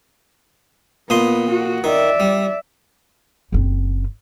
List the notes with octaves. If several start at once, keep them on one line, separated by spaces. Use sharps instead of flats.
A#2 B3 D#5 C6
F#4
D#3 D5 E5
G3
F#1 C4